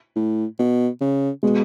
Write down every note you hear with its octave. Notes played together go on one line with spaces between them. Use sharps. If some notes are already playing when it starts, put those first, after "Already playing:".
A2
B2
C#3
B2 G#3